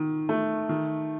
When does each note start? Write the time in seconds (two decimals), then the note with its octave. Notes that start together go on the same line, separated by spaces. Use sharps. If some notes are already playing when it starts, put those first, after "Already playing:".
Already playing: D#3
0.29 A3
0.69 D#3